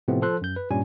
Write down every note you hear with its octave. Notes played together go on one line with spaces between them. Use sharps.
A2 C3 F3 A3 B3 C4
F3 A4 C5 C6 F#6
F#2 G6
B4
G2 A#2 G3 C#4 G#5